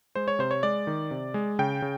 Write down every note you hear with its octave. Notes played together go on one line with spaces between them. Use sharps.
G#3 C5
C#5
C3 C5
C#5
G#3 D5
D#3
C3
G#3
C#3 G5
C#3